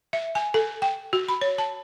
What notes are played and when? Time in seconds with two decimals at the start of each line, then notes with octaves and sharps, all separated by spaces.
0.13 E5
0.35 G#5
0.54 A4
0.82 G5
1.13 F#4
1.28 B5
1.41 C#5
1.58 A5